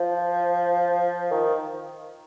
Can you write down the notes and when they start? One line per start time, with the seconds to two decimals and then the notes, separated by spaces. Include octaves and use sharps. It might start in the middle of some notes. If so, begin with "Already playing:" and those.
Already playing: F3
1.31 D#3